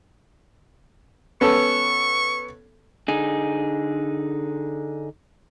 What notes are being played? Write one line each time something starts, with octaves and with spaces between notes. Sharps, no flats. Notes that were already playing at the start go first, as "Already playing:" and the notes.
B3 C#4 A4 C#6
D3 D#4 G#4